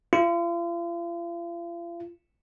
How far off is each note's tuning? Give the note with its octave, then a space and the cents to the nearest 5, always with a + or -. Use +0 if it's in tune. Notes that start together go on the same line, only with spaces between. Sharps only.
F4 -40